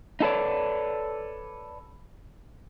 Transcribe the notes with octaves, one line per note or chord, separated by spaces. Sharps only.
D#4 E4 A4 B4 C#5 D5